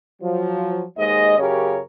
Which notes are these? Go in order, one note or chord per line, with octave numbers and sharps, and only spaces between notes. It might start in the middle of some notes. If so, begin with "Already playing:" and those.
F3 F#3
D#2 G#2 G#3 D#5
F#2 C#3 G4 A#4 C#5